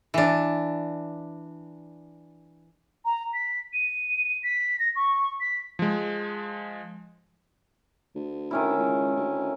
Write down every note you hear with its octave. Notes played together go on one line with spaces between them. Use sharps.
E3 D4
A#5
B6
D#7
B6
A#6
C#6
B6
F3 G#3
D2
D#3 C#4 E4
C#2
D2